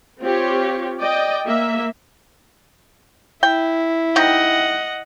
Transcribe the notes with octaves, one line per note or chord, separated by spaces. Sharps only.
C4 F4 G4 C#5
D5 D#5 G5
A#3 E5
E4 G5
C3 D#4 D#5 F#5 G5